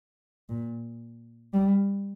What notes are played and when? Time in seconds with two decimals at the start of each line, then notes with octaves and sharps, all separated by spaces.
0.49 A#2
1.53 G3